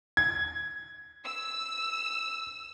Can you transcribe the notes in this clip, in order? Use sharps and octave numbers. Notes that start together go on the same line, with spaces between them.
G#6
E6